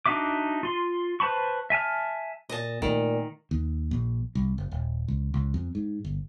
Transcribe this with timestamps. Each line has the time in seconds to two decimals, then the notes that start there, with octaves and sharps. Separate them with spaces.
0.06 D4 D#4 F#4 E5 D6
0.63 F4 C6
1.20 B4 C5 A5 B5 C#6
1.70 E5 G#5 A5 F6
2.49 A#2 D#5 A5
2.82 A#2 D#3 A3
3.51 D#2
3.91 A#1
4.35 C2
4.58 F#1
4.71 D#1
5.08 C#2
5.34 C#2
5.54 F2
5.75 G#2
6.04 G1